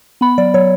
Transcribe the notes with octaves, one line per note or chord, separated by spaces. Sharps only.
B3 B5
F#3 D5
F#3 C#5